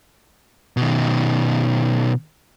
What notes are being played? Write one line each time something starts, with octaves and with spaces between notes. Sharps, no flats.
B2 D#3